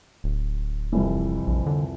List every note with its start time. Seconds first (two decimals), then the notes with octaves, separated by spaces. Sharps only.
0.24 D1
0.93 C2 F2 E3
1.47 A#1
1.66 D3